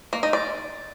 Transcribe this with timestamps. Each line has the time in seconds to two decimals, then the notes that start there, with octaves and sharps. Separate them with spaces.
0.13 A#3
0.23 D#4
0.33 D5